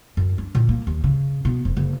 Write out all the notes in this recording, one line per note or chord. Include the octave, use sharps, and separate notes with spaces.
F#2
D4
A#2
A#3
D#2
C#3
B2
F1
F#1